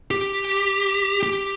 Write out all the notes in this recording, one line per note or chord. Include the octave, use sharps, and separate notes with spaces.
G4
G4